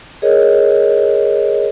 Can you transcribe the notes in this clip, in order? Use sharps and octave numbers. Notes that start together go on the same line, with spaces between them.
G#4 A#4 C#5 D#5